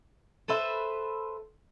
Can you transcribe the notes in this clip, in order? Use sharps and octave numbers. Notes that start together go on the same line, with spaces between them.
A4 B4 C5 E5